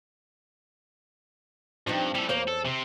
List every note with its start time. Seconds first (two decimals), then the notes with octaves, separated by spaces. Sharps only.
1.87 G2 F3 C4 D#4
2.15 G3 E4 A4
2.29 E2 A#3 C5 C#5
2.48 A4
2.65 C3 C4